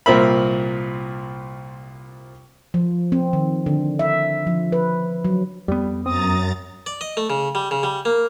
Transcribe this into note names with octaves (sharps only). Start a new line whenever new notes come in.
C2 A#2 C4 A#4 E5 B5
F3
C4
D#3
D3
E5
F3
B4
F#3
F2 G3 B3
F#2 C4 A#5 D#6 A6
D5
D#5
A3
C#3
G3
C#3
G3
A#3